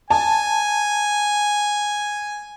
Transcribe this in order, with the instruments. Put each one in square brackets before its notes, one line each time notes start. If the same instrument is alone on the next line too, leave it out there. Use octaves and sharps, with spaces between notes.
[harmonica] G#5 [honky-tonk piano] A5